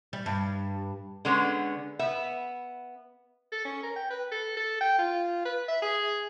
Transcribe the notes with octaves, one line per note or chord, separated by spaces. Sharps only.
G3
G2
D3 G#3 B3 C#4
B3 E5
A4
C#4
A#4
G5
B4
A4
A4
G5
F4
B4
E5
G#4